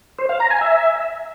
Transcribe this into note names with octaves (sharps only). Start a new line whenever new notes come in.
C5
F5
A#5
G#5
E5